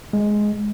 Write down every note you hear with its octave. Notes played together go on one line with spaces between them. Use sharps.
G#3